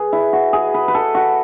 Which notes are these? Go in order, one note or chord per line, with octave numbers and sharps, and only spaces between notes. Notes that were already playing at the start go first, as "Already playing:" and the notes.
Already playing: G#4 B4
E4
F#4
G#4
B4
B4
A4
F#4